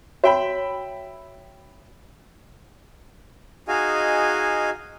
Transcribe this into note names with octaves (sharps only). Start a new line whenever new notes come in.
F#4 C#5 E5 G5 B5
D#4 F#4 G#4 D#5 F5 G#5